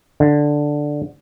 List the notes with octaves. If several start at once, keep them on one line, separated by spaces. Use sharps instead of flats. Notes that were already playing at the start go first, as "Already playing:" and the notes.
D3